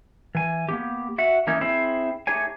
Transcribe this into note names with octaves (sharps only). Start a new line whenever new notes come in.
E3 G#5
A#3 B3 G4
F#4 E5 F#5
E3 A#3 C#4 D#4 E4
C4 E4 G#4 C5 E5
A3 D#4 G4 G#4 C#5 G#5